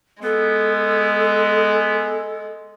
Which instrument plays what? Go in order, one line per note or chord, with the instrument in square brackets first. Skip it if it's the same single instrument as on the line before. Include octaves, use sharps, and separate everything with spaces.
[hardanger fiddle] G#3 [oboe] B3 [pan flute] A4